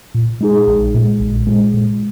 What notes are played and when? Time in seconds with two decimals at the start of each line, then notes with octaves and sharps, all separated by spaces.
0.14 A#2
0.41 G#3 D#4 G#4
0.67 A#1
0.94 A#2 G#3
1.20 A#1
1.47 A#2 G#3
1.74 A#2